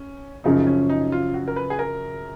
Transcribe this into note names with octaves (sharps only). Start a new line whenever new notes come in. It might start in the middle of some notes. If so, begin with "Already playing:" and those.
Already playing: C#4
F#2 C#3 F3 D#4
C#4
D#4
F4
F#4
A#4
B4
G#4
A#4